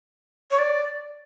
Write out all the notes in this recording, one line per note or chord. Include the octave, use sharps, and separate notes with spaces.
C#5
D5